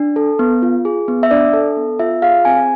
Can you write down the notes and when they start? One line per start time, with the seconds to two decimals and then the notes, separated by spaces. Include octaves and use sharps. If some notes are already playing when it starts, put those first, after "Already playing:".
Already playing: D4
0.16 A4
0.39 B3
0.62 F4
0.85 G#4
1.08 B3
1.23 E5
1.31 D4 D5
1.54 A4
1.77 B3
1.99 F4 E5
2.22 G#4 F5
2.45 C4 G#5